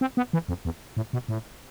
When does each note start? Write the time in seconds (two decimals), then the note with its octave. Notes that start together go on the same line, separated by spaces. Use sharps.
0.01 C4
0.17 B3
0.33 E3
0.48 F2
0.65 E2
0.97 A2
1.13 B2
1.28 A2